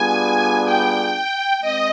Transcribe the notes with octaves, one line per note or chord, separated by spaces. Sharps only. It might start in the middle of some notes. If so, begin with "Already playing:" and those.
Already playing: G3 B3 D4 F4 G#4 G#5
G5
G#3 C4 D#5